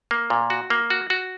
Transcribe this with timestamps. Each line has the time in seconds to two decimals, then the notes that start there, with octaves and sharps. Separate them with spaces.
0.11 A#3
0.30 A#2
0.50 F#4
0.70 A#3
0.90 F#4
1.10 F#4